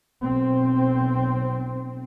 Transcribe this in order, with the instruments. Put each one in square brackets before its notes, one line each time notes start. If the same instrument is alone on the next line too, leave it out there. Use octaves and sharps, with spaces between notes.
[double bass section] B1 C4